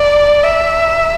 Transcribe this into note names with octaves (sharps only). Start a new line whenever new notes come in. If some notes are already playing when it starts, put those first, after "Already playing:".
Already playing: D5
E5